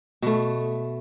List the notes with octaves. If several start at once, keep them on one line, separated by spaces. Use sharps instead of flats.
B2 A3